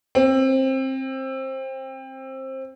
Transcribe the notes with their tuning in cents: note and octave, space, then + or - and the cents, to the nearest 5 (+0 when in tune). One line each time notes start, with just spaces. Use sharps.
C4 +20